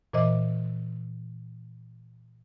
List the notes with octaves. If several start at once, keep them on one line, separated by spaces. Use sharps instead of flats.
A#2 E3 C5 D#5 D6